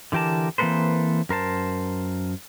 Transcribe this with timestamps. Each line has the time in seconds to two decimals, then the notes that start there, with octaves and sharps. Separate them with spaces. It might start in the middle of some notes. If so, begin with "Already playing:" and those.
0.12 D3 E3 G4 A#4 A5
0.58 E3 A#3 C4 A4 B4 C5
1.29 F#2 A#4 C5 A5